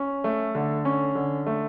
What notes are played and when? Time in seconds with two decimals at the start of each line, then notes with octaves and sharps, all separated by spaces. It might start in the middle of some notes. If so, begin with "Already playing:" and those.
Already playing: C#4
0.24 A3
0.55 D3
0.85 C#4
1.15 D3
1.46 A3